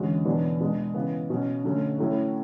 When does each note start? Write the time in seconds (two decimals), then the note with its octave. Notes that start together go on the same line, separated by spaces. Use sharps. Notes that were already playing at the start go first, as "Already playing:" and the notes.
Already playing: E2 D3 G#3 C#4 F#4
0.25 E2 B2 F#3 B3 D4
0.60 B2 G#3 D4
0.94 C#3 E3 B3
1.30 B2 F#3 C#4 F#4
1.64 D3 F#3 A3 C#4
1.99 A2 F#3 A3 C#4 E4